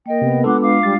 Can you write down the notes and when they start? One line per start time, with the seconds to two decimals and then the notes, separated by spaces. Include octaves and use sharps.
0.06 A#3 A#4 D#5 G5
0.22 C3 B3
0.44 G#3 D4 F4 A4 F#5 C6 D6
0.61 F5 D6
0.83 G3 A6